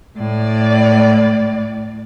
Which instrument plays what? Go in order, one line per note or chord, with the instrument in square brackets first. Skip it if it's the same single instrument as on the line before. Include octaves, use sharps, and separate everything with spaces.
[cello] A2 D5